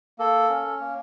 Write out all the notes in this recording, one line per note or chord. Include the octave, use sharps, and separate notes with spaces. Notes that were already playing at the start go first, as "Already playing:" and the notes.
A#3 A4
C#4
A#3